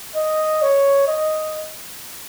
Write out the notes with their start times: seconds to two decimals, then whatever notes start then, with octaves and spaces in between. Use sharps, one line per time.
0.16 D#5
0.62 C#5
1.07 D#5